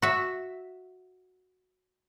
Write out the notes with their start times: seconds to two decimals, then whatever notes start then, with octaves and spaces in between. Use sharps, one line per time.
0.02 F#4 E5